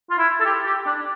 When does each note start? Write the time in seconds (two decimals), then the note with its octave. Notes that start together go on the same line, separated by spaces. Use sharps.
0.10 F4
0.19 E4
0.41 A4
0.45 G4
0.66 G4
0.87 D4